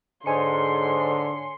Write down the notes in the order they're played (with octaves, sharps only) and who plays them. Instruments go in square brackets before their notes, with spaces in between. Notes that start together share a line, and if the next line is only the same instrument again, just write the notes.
[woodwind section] G#2 [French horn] D3 [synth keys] C#5 G#5 C#7 [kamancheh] C6